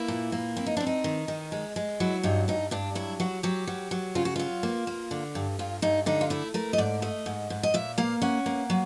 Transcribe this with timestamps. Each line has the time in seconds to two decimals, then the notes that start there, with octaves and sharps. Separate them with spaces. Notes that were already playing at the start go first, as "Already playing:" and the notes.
Already playing: A#3 E4
0.08 A#2
0.32 A#3
0.57 C4 E4
0.66 D#4
0.77 C4 D4
0.87 D#4
1.04 D#3
1.28 D#3
1.52 G#3
1.76 G#3
2.00 F#3 E4
2.23 G2 D#4
2.48 G2 D#4
2.71 G2 D4
2.95 F#3 E4
3.20 F#3 F#4
3.43 F#3 G4
3.67 F#3
3.91 F#3
4.15 C#3 F4
4.25 F#4
4.36 F#3 F4
4.63 A#3
4.87 A#3
5.11 D3
5.35 G2
5.59 G2 F4
5.82 G2 D#4
6.06 D3 D#4
6.21 F4
6.30 A3 E4
6.54 A3 A#4
6.73 D#5
6.78 G#2 D5
7.02 A3 D#5
7.26 G#2
7.50 G#2
7.63 D#5
7.74 A#2 E5
7.98 A#3 F5
8.22 C#4 F#5
8.46 A#3
8.70 F#3